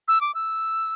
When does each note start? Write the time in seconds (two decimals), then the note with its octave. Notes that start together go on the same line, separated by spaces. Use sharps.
0.08 E6
0.21 D6
0.35 E6